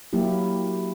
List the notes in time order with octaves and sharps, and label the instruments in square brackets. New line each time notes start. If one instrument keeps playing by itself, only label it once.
[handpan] F#3 A#3 E4 G4